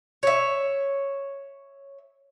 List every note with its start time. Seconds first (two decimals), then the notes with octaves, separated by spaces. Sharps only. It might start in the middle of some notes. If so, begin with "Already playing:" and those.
0.23 C#5 E5